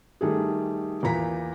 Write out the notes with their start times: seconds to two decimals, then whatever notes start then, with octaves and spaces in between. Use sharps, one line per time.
0.21 D#3 G3 A3 G#4
1.03 E2 A#2 A#5 B6